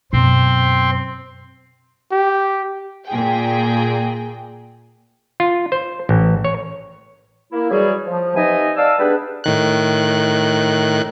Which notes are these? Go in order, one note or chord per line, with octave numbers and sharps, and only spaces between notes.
F#2 B2 C4 C5
G4
A#2 G#4 G5
F4
C5
A1
C#5
A#3 E4
E3 F#3 G3 F#4 G#4
F3
C3 B3 D#4 D#5 E5 G#5
D5 D#5 F5 A5 E6
G3 B3 D4 G#4 B4
A2 D#3 F#6